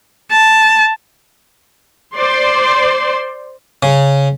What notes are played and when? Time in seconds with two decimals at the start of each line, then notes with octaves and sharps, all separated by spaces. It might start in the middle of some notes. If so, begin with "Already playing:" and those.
0.31 A5
2.15 C5 D5 C6
3.83 C#3